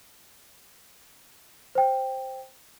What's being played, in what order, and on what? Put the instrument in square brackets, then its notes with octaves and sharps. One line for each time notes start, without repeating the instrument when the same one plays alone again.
[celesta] C5 G5